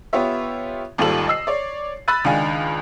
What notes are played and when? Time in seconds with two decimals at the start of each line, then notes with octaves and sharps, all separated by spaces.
0.13 B3 F4 G4 C#5 E5
0.98 G#1 D#2 G3 F4 A4 F#7
1.28 D#5 E6 C7
1.47 C#5 D5
2.08 B5 E6 F#6 A6 D#7
2.24 C#2 D#3 D4 F5 G#5